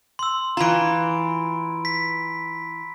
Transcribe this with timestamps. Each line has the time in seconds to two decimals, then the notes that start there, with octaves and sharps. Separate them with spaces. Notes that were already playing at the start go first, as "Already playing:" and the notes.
0.19 C6 E6
0.57 E3 F4 A#5 B5 D7
1.85 B6